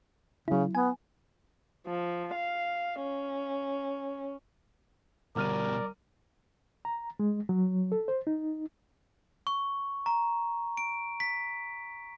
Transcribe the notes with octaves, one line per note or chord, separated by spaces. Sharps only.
C#3 F#3 E4
B3 G#5
F3
F5
C#4
G1 B2 G3 A#4 D5 F6 D#7
A#5
G#3
F#3
A4
C5
D#4
C#6
A#5
D7
B6